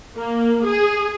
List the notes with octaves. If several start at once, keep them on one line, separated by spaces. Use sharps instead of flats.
A#3
G#4